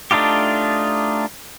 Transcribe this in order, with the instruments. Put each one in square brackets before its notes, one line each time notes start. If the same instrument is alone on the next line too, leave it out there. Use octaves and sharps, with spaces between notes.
[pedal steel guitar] A3 D4 D#4 F4 G4